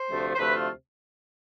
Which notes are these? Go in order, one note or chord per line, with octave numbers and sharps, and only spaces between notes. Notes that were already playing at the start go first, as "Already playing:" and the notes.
Already playing: C5
D2 C3 F3 A3
C5
D2 C3 F3 A3 B4
F4